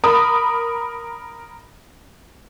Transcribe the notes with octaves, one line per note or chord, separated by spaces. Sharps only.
A#4 B5 D#6